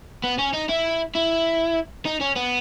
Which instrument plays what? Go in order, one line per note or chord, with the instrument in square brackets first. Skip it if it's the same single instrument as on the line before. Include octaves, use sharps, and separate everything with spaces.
[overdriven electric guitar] B3
C#4
D#4
E4
E4
D#4
C#4
B3